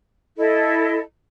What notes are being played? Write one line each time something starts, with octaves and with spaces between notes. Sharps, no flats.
E4 A4 D#5